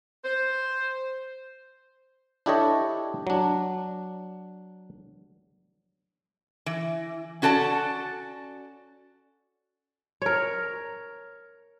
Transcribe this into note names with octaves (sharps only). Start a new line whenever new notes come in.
C5
D4 E4 G4 A4 C#5 D#5
F#3 D4
E3
C#4 F#4 A4 D5 A5
A#4 C#5